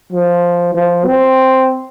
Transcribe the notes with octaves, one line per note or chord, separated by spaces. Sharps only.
F3
F3
C4